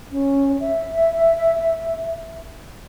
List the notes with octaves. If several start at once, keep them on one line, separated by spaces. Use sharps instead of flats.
C#4
E5